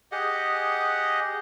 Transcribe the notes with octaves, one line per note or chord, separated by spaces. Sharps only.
G4 G#4 D#5 F#5